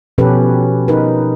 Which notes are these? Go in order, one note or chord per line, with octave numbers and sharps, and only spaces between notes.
B2 F3 C#4 G4 A4 B4
D#4 A#4 B4